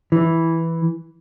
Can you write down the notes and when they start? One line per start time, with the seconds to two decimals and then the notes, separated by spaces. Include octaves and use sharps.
0.12 E3